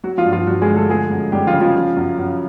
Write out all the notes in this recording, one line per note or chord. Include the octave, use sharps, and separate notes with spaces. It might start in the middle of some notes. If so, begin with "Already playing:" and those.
F#3 F#4
F3 F4
G2
F3 F4
G2 F#3 F#4
G#3 G#4
D3
A3 A4
F3 G#3 G#4
F#2
F#2 G3 G4
F3 F4
C#3
F3 F4
F3
F#2
F#2